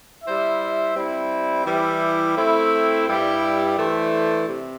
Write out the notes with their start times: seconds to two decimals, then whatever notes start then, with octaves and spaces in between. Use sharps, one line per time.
0.24 G3 E4 C5 E5
0.95 G3 C4 E4
1.65 E3 G3 E4 G4
2.36 A3 C4 E4
3.06 G2 G3 E4 G4
3.78 E3 A3 D4 C5
4.47 C3